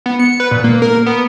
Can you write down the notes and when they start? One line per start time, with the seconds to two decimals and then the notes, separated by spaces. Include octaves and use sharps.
0.06 B3
0.19 C#7
0.40 B4
0.51 A#2
0.64 A#3
0.82 A#4
1.06 B3